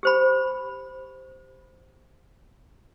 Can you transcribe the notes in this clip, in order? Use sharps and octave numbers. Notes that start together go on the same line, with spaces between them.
G4 C5 B5